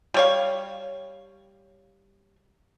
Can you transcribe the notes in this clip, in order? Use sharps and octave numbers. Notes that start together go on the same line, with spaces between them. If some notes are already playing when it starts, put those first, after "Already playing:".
G3 C#5 F5